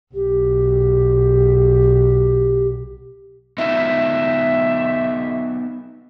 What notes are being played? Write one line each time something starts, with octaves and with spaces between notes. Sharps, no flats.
B1 G4
B3 D#4 F4 E5